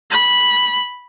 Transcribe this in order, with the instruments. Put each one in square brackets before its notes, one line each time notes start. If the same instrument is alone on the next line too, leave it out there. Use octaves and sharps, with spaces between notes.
[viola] B5